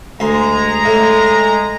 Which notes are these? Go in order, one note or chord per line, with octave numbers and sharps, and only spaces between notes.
D2 G#3 A#5 C6
A2